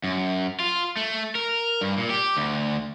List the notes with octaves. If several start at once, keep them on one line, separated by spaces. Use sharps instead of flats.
F#2
F4
A3
A#4
G2
A#2
G4
D2